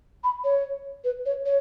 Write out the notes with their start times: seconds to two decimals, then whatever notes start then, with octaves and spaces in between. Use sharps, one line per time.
0.24 B5
0.44 C#5
1.04 B4
1.26 C#5
1.46 C#5